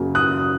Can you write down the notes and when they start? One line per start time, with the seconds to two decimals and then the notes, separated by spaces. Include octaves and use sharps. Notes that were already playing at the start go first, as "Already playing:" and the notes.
Already playing: F#2 C#3 F#3 A#3
0.15 D#6 F#6